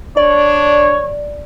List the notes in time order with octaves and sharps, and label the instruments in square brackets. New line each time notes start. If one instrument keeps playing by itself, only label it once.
[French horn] D4 [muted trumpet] C#5 [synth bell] D5